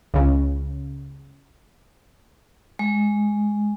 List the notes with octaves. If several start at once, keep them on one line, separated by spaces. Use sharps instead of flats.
C#2 C#3
G#3